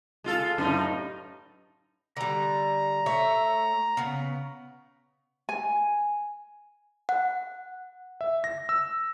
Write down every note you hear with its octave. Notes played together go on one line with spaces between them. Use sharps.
G#3 F4 A4
F#2 A2 D#4
D3 G3 A#5
A3 C#5 E5
C#3 B3
G#5
F#5
E5
A#6
E6